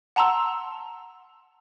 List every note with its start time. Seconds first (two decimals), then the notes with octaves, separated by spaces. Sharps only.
0.16 F#5 A5 A#5 C6 E6